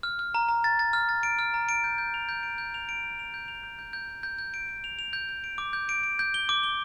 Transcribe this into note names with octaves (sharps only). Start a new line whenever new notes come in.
F6
F6
A#5
A#5
A6
A6
F6
A6
D7
F6
A#5
D7
G6
G6
F7
G6
D7
G6
F7
D7
G6
F7
G6
F7
G6
G6
G6
G6
G6
G6
D7
D7
F7
F7
G6
G6
D7
D6
G6
D7
D7
G6
G7
D6
G7